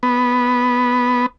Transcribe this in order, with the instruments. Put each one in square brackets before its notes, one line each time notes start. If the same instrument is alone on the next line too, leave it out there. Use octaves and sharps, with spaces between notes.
[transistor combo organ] B3